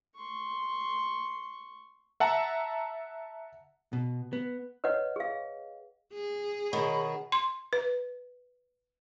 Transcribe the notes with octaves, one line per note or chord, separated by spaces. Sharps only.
C6 C#6
E5 F#5 A5 A#5
B2
B3
B4 C#5 D#5 F#5
G#4 F5
G#4
B2 D#3 C#5 B5
C6
B4